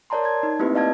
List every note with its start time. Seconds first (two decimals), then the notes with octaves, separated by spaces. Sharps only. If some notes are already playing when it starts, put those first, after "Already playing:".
0.10 A#4 C#5 D5 A5 A#5 C6
0.24 A5 G#6
0.43 D#4
0.59 A3 A#3 C4 E4 G4 B4
0.75 D5 D#5 F5 A5 G#6